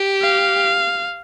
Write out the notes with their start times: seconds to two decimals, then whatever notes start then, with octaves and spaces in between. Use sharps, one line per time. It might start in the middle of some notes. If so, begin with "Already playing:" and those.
Already playing: G4
0.22 F5